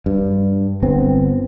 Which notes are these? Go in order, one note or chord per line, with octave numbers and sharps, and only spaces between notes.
G2
G1 B3 C4